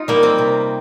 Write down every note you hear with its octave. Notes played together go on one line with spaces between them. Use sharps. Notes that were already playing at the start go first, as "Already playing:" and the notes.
Already playing: D#4 F4
G3 A#3
C4
C3